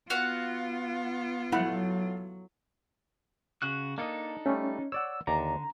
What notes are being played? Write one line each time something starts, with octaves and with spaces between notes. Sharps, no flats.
B3 F4 F#4 F5 F#5
F#3 A3 E4 F#5 B5
C#3 F#4 F#6
A#3 D4 D#4 A4 D#5
G3 A3 C#4
C#5 D5 F#5 E6
D#2 D3 D5 A#5